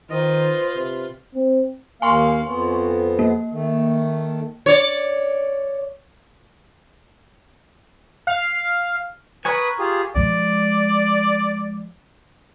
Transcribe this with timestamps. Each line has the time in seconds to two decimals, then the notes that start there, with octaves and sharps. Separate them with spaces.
0.10 D#3 F4 B4 C5 D#5
0.75 C3
1.35 C4
2.02 D#2 A#3 F5 G#5 C6 C#6
2.46 F2 B3
3.19 A#3
3.52 D#3 A3
4.66 C#5 D5
8.27 F5
9.45 A#4 B4 C#5 G#5 B5 D#6
9.79 F4 G4 G#4
10.16 F3 G#3 D5